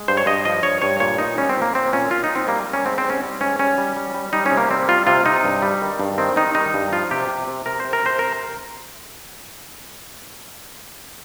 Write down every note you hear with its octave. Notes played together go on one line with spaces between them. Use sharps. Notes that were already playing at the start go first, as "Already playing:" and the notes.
Already playing: G#3
G2 C5
C#5
G2 D#5
F3 D#5
G2 C#5
G2 C#5
A#2 C#5
A#2 D#4
G3 C#4
C4
A#2
A#3
A#2 C4
A#2 C#4
A#2 F4
D#4
A#2
C4
G3 A#3
G3
C#4
G#2 C4
C4
G3
C#4
G3
G#2 C#4
G3 C#4
G3
G3
G3
G3 D#4
C#4
C3
A#3
G3 C4
G3 F4
C3 F4
C3 D#4
G2
G3
D#3
G2
D#3 C4
D#3 D#4
G3 D#4
G2
F3 F4
C3 G4
C3
C3
C3 A#4
C3 C5
A#4
C3 C5
C3 A#4